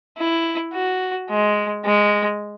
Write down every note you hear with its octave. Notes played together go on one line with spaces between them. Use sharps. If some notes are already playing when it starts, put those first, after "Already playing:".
E4
F#4
G#3
G#3